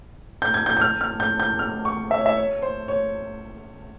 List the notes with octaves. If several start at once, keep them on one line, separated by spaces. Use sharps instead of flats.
G6
G#6
G6
G6
F6
F6
G6
G6
F6
C#6
E5
C#5
E5
C#5
C5
C#5